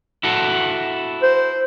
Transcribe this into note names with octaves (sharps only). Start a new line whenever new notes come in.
E4 F#4 A4
C5